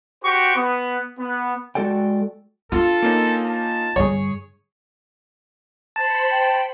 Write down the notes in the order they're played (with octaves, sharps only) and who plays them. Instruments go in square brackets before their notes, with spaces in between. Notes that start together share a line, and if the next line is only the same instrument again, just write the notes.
[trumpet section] F#4 G4 C5 G5 C#6
B3
B3
[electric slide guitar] G#3 F#4 A4 D5 G5
[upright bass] D4 [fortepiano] F4 [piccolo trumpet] A4
[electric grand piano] A#3 C#4 D#4
[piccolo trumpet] A5
[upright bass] G2 D3 [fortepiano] G#4 C#5
[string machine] C5 B5 C#7 [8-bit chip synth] A5
[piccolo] G5